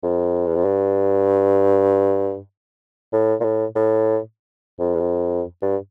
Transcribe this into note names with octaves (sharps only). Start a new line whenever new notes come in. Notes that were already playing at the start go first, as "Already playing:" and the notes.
F2
E2
F2
G2
A2
A#2
A2
A2
F2
E2
F2
G2